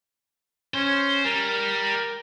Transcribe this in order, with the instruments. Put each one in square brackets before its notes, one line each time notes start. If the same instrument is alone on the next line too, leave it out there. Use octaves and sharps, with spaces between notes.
[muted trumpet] C#4 [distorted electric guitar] C5
[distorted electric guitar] G3 [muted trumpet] A#4